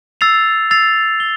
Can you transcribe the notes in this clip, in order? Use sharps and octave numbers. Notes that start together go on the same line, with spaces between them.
E6 A6 C7 F7
E6 A6 C7 F7
G7